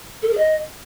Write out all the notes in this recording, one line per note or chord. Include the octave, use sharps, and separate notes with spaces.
A4
A#4
G#4
D#5